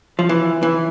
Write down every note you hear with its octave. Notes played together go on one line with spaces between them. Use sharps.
F3
E3
E3